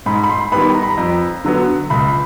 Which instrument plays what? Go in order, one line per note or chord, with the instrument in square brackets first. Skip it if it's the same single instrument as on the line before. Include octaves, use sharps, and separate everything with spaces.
[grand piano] G#2 B5
B5
C6
D#3 G3 B3 B5
A#5
B5
A#5
F2
D3 F#3 B3
C#2 B5